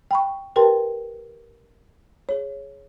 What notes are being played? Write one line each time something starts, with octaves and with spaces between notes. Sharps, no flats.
G5 B5 C#6
G4 A#4 B4 G5 A5 C6
G#4 C#5